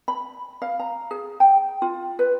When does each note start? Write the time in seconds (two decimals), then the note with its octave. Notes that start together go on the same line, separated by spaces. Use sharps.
0.08 B5
0.62 F5
0.80 A#5
1.11 G#4
1.40 G5
1.82 F4
2.19 B4